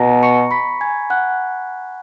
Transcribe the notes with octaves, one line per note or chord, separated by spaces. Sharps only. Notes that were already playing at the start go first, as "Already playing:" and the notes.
Already playing: B2 A#5 A#6
C#6 C#7
B5 B6
G#5 G#6
F#5 F#6